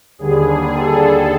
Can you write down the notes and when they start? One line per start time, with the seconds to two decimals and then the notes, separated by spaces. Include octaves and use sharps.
0.19 D#2 D3 G3 G#4
0.72 A4